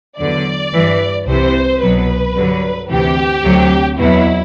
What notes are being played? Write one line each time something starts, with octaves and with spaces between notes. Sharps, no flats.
E2 D3 F#3 D5
G2 E3
C2 C3 E3 C5
C2 B2 F#3 B4
G2 D3 F#3
D2 C3 E3 G4
D2 C3 F#3
E2 B2 F#3 E4